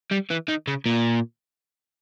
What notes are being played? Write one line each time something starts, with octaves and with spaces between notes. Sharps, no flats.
G3
E3
D#3
C#3
A#2